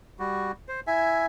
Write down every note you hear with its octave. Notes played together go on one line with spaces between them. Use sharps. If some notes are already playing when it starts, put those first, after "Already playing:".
G3 F#4
C5
E4 E5 G#5